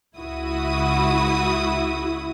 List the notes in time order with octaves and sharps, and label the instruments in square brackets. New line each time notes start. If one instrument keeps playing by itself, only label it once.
[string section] C#2 E4 F#4 D#6